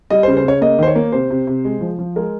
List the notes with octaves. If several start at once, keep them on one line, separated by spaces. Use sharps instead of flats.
G3 D#5
C5
C#3
C5
C#3 C#5
A#3 D#5
D#3 C5
C#5
A#3
C3 C5
C3
C3
G#3
F3
F3
G#3 A#4